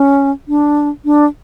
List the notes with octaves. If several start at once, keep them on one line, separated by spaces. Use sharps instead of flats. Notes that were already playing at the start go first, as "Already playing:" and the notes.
Already playing: C#4
D4
D4